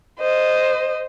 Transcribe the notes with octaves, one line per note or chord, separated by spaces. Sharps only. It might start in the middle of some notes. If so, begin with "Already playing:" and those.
C5 D#5